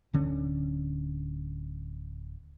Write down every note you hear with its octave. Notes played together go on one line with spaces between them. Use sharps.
D1 D3 C#4